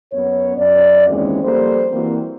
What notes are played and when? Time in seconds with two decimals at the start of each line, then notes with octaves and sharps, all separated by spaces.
0.12 F#2 B3 C#5
0.56 F#2 D5
1.08 D#2 E3 G#3 C4 C#4
1.43 F3 G3 A#3 A4 C5
1.92 E3 G3 A#3 C4 F#4